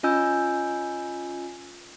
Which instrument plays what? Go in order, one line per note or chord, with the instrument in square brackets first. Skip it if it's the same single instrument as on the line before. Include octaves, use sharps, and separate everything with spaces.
[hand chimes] C#4 F4 D#5 G#5 E6 G6